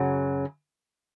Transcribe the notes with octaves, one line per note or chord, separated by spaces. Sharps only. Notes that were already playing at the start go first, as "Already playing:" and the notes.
Already playing: F#2 C#3 F#3